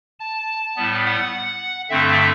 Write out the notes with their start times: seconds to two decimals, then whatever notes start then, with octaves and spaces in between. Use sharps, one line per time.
0.20 A5
0.76 A2 G3 B3
1.05 F#5
1.90 G2 D3 A3 C4 E5